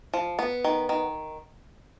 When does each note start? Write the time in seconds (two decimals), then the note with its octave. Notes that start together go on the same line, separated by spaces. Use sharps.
0.14 F3
0.39 B3
0.64 D#3
0.89 D#3